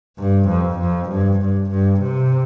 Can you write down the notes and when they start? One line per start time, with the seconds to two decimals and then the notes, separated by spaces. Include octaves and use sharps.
0.18 G2
0.49 F2
0.80 F2
1.09 G2
1.40 G2
1.70 G2
2.01 C3